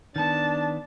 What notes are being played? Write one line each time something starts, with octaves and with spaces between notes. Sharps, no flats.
D#3 B3 D4 A5